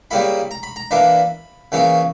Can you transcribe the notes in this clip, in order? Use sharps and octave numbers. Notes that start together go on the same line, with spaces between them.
C#3 G3 A#3 E4 B5
A#5
B5
A#5
E3 A#3 D4 B5
C#3 E3 A#3 C#4